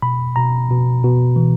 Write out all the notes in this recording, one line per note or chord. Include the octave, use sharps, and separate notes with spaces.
B2 B5
B2 A#5
B2
B2
E3